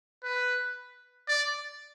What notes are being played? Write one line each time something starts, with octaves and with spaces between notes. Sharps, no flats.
B4
D5